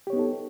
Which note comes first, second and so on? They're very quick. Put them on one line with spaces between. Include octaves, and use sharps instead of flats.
G4 C#5 B3 D#4 A4